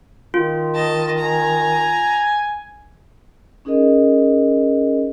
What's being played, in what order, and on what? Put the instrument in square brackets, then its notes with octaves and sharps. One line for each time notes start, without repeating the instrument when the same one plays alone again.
[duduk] D#3 [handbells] F4
[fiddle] D#5 A5
[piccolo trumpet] G#5 [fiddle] A#5
[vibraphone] C#4 D#4 G#4 A#4 D#5